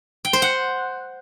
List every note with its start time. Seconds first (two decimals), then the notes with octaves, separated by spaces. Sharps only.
0.25 G5
0.33 C5
0.42 F#5